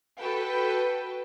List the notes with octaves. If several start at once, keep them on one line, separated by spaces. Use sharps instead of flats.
F#4 A4 B4 G5